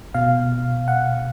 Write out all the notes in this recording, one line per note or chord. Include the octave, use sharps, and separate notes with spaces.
B2 F5
F#5